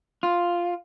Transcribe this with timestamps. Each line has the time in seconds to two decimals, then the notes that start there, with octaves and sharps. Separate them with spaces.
0.23 F4